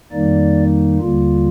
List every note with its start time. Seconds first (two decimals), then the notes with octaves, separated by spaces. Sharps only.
0.12 F2 D#3 G3 A#3 D#4 D5
1.00 D#2 D3 G3 A#3 F4